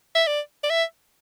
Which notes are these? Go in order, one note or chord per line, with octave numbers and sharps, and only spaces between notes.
E5
D5
D5
E5